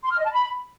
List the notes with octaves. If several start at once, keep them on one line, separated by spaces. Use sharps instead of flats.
C6
F6
D#5
A5
B5